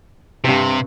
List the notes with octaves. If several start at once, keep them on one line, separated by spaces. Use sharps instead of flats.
G2 C3 C4